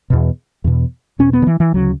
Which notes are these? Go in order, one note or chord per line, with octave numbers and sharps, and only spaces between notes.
E2 B2
E2 B2
E2 B2 C#4
B3
D3
E3
E3
D2 C#3 F#3